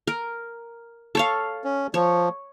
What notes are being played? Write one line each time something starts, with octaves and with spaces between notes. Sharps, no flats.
A#4
A4 C#5 F5
C#4
F3 C#5